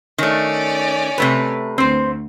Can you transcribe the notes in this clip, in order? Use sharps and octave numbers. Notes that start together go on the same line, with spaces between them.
D#3 A3 C#4 D5
C3 A3 B4
D2 C4 C5